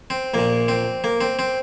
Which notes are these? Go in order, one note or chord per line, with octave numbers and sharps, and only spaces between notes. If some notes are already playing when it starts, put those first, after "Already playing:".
C4
A#1 A#2 A#3
C4
A#3
C4
C4